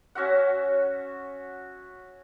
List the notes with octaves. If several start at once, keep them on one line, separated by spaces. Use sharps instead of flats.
C#4 F#4 E5 F#5